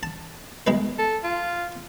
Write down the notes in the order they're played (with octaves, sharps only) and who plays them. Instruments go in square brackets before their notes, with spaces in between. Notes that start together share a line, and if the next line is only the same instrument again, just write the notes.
[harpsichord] A5
B1 G#3 B4
[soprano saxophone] A4
F4